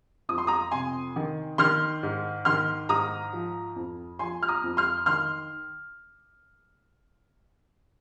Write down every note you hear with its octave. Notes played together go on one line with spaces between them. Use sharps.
F2 D#6
C6
A#5 D#6
C3 G#5 C6
D#3
D#3 C6 F6
G#2
D#3 C6 F6
G#2 A#5 D#6
F3
F2
F3 G#5 C6
F6
A#5 D#6
F2
C6 F6
D#3 C6 F6